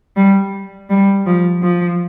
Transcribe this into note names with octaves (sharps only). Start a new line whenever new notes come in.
G3
G3
F3
F3